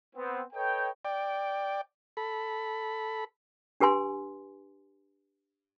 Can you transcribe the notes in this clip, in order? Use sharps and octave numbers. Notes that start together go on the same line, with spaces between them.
B3 C4
A4 B4 C#5 D#5 G5
D5 G5
A4 B5
D4 G4 B4 G#5 C6